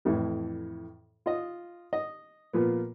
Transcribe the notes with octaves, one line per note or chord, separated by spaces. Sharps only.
F2 A2 E3
F4 D#5
D#5
A#2 F3 B3